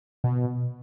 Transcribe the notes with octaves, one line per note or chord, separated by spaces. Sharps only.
B2